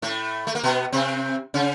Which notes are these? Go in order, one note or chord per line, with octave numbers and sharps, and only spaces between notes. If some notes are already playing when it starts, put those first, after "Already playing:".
A2 A3
A3
A#3
B2 B3
C3 C4
C#3 C#4